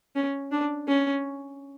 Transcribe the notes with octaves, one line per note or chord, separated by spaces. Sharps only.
C#4
D4
C#4